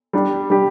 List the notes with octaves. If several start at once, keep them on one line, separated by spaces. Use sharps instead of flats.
G3 D4 G4
G3 D4 G4